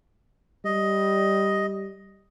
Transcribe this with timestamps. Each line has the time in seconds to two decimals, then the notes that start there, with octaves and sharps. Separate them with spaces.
0.65 G3 D#5